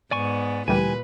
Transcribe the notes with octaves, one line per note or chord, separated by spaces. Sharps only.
G#2 B3 D5 G#5 C#6
D2 A#2 E3 G3 B4 G#5